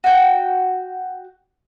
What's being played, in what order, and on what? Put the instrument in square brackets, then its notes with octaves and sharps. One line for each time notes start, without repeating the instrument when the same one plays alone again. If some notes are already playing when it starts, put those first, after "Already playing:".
[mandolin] F#4 G5